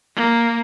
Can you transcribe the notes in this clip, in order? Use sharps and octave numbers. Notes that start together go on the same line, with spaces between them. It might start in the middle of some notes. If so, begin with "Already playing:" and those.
A#3